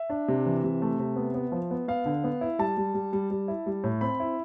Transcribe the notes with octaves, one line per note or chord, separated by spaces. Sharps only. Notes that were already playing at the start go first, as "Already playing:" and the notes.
Already playing: E5
D4
C3
E3
C3
A3
C3
B3
B3
F3
B3
B3 F5
D3
B3
E4
G3 A5
G3
G3
G3
G3
E4
G3
A2
C4 B5
E4